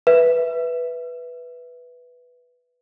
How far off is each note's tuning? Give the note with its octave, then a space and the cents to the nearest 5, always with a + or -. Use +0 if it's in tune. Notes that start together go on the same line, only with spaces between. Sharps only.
B4 +0 E5 +0